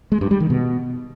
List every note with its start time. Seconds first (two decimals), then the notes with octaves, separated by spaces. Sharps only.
0.12 G#3
0.21 G2
0.31 G3
0.40 D#3
0.50 B2